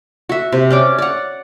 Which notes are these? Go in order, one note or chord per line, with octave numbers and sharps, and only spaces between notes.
F#4 E5
C3
C#4 D5 D6
D5 F#5